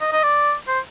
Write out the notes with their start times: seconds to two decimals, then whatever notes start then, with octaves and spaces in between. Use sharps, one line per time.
0.01 D#5
0.12 D#5
0.23 D5
0.68 C5